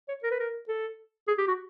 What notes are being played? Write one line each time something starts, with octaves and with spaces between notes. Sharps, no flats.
C#5
A#4
B4
A#4
A4
G#4
G4
F#4